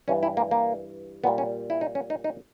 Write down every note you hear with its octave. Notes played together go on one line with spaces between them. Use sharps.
G2 E3 G3 C#4
E4
A#3
A#3
A#2 G3 B3
C#4
E4
D#4
C#4
D#4
D#4